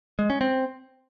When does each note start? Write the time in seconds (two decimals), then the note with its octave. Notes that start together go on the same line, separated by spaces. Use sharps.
0.19 G#3
0.30 C#4
0.41 C4